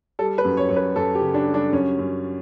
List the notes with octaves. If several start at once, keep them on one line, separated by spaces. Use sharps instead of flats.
G3 A4
B4
F#2
C#5
F#2 C#5
B4
F#2 A4
G4
C#3
D4
G3
D4
F#2 C#4
F#2